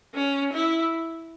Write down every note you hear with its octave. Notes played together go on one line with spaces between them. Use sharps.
C#4
E4